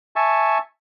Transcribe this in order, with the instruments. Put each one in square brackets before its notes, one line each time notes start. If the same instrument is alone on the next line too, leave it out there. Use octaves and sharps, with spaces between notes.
[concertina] E5 G#5 A5 C#6